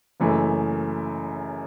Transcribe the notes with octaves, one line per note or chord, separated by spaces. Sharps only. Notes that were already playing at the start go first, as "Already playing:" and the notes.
F#1 F#2 E3 A3